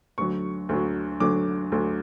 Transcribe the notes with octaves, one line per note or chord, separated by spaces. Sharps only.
D2 D3 F#3 C#6
D2 D3 F#3
D2 D3 F#3 D6
D2 D3 F#3